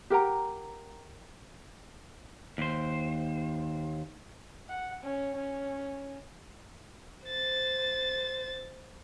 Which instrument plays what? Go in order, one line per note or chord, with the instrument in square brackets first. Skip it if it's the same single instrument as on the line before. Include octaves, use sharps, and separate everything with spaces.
[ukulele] G4 A#4 F#5 A#5
[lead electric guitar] D#2 C5
[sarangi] F#5
C#4
C#4
[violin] C5 A6